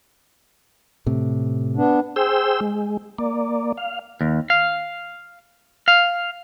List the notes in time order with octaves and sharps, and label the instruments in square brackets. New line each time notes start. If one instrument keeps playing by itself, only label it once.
[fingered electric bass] A2 C3
[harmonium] B3 D4
[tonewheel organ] G#4 C5 G5 E6
G#3
A#3 D5
F5
[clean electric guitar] D#2
F5
F5